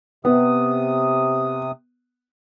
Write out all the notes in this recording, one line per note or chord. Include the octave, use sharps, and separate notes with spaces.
C3 B3 D#6